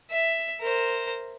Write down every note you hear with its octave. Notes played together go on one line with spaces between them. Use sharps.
E5
A#4 C5